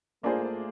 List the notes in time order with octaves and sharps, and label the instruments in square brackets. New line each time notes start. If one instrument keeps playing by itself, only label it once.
[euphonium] A3 [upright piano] A#3 D4 F4 G#4 C5